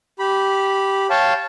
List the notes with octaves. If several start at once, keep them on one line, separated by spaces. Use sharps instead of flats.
G4 B5
C#5 F5 G5 A5